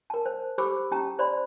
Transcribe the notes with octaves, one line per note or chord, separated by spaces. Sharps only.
A#4 A5
C5
G4 A4 C5 B5 D6 E6
C#4 G4 A5 A#5
C5 D5 B5 C6